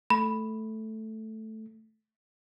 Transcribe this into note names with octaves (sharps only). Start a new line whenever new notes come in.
A3 B5